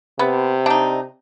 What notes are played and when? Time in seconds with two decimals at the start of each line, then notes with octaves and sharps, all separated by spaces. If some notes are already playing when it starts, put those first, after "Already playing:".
0.19 C3 B3
0.66 D4 D#4